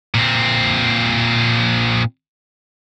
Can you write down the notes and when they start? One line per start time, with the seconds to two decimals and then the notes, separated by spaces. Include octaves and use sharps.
0.15 A#2 C4